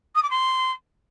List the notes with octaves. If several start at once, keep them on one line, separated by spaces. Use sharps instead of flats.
D#6
D6
C6